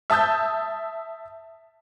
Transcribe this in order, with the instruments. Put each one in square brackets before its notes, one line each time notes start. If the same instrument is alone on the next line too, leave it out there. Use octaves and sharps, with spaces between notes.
[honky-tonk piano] E5 A5 D#6 E6 G6